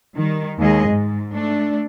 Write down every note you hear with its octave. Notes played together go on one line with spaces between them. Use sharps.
D#3 G3
D#2 G#3 G#4 D#5
G#2
A3 D4